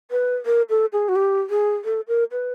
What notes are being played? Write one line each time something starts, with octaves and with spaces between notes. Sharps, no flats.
B4
A#4
A4
G#4
F#4
G4
G#4
A4
A#4
B4